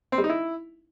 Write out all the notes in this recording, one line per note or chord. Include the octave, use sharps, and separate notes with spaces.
C4
G3
D#4
E4